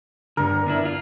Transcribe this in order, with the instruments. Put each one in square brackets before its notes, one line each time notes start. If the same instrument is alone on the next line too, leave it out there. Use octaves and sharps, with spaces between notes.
[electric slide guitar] G2 D3 [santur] A#4
[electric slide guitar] B3 D4 E4
F4